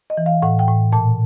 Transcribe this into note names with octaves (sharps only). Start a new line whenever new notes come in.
D#5
E3
F5
A2 F#5
G5
A2
A#2 A5